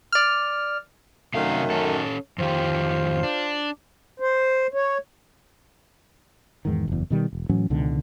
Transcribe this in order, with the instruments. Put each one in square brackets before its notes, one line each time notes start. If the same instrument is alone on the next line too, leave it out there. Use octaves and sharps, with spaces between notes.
[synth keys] D5 F6
[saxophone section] F#2 D#3 A3 [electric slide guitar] C3 F5
[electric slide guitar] C#4 A4
[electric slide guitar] F2 D#3 G4 [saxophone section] F4 C5
[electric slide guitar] D4
[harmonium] C5
C#5
[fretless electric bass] E2 G#2 D#3
F#1 E2
B2 D#3 G3
E1
A2 E3 F#3 C#4
C#2 B2 D3 D#3